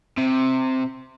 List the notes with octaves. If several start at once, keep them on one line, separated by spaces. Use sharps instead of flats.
C3